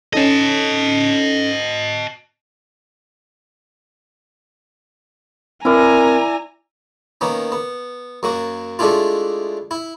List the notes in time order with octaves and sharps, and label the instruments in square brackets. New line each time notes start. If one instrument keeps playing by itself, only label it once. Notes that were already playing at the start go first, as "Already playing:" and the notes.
[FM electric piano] C#4 D#4 A4 [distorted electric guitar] D#5 A5
[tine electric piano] C4 A#4 [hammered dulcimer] E4 D5 [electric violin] G#5 A#5
[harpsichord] D#3 A#3 B3 C#4
B3
F#2 A#3 F#4
G#3 A3 D4 E4 F4
E4